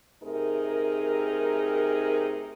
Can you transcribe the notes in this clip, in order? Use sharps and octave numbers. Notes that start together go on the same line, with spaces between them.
C3 A3 D#4 G#4 A#4